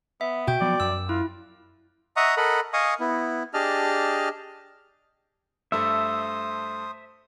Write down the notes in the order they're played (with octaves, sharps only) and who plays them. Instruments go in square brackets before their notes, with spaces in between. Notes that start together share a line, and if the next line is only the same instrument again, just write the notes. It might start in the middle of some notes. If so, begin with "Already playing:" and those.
[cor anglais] B3 [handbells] E5
[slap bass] B2 [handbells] F#4 G5 G6
[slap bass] F3 F#3 B3 [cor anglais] D5
[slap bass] F#2 [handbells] E6
[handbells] E4 [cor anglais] F4
[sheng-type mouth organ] D#5 E5 F#5 A#5 C#6 D#6
A4 A#4 D#5 F#5 B5
D#5 F5 G#5 C#6 D#6
B3 E4
D4 G4 G#4 D#5 A5 F6
[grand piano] G2 A3 [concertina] C5 D#6 [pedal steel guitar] E5